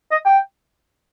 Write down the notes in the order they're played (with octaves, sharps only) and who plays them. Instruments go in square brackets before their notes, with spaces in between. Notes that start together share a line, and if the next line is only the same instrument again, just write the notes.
[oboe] D#5
G5